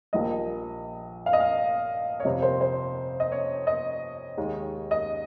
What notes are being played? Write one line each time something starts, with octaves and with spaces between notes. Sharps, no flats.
A#1 A#2 G3 A#3 D#5
F5
D#5
F5
C#5
F2 C3 G3 D#5
C5
C5
D#5
C#5
D#5
D#2 D#3 G#3
D#5